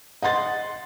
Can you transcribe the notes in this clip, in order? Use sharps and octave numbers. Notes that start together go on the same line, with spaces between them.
D#5 F#5 C6 A6